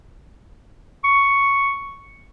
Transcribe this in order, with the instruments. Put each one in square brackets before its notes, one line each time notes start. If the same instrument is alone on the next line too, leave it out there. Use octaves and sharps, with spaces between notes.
[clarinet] C#6